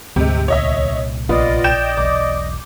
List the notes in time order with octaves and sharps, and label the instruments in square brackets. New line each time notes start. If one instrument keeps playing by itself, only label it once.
[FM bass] D2 [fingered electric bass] G#2 [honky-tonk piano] C3 G#3
[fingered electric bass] C2 A#2 [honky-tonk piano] C#5 D#5 E5
[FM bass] A#1 [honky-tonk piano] B3 F4 [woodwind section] D5 D#5
[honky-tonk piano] G5 G6 E7
[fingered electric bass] E1 B1 [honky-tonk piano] D6